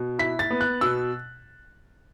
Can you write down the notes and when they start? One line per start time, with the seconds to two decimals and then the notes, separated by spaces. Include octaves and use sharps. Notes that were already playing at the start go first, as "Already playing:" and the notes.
Already playing: B2
0.19 E4 B6
0.39 A6
0.51 B3
0.61 F#6
0.81 B2 E6